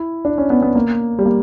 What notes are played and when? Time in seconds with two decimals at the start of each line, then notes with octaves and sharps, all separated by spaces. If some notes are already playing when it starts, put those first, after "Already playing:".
Already playing: E4
0.25 D4
0.38 C#4
0.50 B3
0.62 B3
0.75 A#3
1.19 G3
1.26 A#3